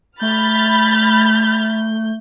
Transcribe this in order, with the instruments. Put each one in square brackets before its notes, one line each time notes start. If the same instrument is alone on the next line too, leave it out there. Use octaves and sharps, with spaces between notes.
[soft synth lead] A3 [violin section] B5 F6 A6 [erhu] G6